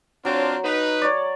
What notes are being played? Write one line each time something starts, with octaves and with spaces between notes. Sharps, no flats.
F#3 C4 D4 F4
D#4 B4
C#5 D5